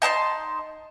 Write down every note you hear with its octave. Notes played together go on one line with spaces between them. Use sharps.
D#4 A5 A#5 C6